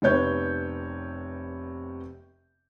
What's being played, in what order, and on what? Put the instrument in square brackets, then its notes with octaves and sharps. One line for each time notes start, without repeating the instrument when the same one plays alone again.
[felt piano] F1 C3 B3 C#5 G6